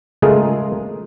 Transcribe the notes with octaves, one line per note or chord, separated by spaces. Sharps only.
C#3 G#3 A3 F4 G#4 A#4